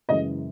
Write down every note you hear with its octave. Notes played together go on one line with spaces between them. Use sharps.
F#1 F#2 E3 G#3 D#5